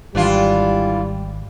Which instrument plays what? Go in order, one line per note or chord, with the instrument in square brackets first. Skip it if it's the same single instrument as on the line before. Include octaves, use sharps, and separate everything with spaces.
[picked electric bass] G#1 [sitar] E3 D4 F4 [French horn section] G3